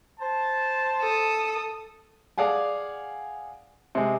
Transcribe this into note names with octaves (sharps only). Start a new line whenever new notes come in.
C5 A5
A4 D#6
G#4 D5 F5 F#5 G#5
C3 G#3